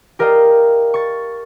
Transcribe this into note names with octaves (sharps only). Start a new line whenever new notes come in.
G4 A#4 D5 D#5 F5 G5
C#6 A6